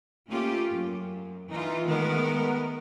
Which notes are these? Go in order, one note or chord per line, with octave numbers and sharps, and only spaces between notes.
A3 A#3 C#4 F4 G4
F#2
E3 D#4 F4
D#3 G#3 A3 B3 A#4